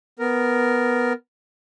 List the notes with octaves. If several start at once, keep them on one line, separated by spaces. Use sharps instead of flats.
B3 A#4